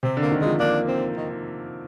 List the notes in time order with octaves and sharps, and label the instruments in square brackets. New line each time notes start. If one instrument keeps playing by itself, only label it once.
[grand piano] C3 [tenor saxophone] C4
[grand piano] D3
[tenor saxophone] A#3
[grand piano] D#3
[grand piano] F3 [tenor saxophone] G#3
[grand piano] A#3 [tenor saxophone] D4
[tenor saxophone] C4
D#3